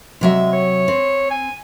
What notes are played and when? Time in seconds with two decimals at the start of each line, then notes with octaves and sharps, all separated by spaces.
0.21 C3 F#3 G#3 E5
0.53 C#5
0.88 C4
1.31 G#5